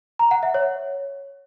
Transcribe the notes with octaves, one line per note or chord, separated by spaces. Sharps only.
A#5
F#5
E5
C#5